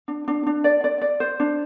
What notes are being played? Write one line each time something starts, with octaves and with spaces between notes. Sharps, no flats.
D4
D4
D4
D5
D5
D5
C5
D4